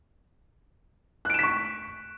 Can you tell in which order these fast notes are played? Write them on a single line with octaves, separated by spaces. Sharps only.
F#6 D7 E7 B6 C#6